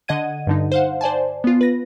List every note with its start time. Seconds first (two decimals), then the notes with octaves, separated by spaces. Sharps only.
0.08 D3 D#5 F#5 G#6 D#7
0.47 G2 D3 D#4
0.72 C5 F5 F#5
1.01 C5 D5 G#5 A5
1.44 B3 F4
1.61 B4 A#6